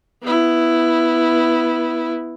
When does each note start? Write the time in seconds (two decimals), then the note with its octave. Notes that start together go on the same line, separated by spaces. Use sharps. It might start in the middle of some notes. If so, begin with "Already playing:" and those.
0.23 B3 E4